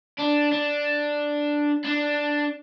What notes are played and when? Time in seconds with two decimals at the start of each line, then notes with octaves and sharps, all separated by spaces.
0.19 D4
0.52 D4
1.84 D4